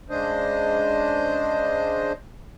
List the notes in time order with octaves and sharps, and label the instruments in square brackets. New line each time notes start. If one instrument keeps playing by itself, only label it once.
[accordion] C#3 G#3 D4 C5 D#5